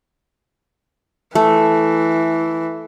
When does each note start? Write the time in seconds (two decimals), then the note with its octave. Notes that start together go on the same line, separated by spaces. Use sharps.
1.35 E3 A3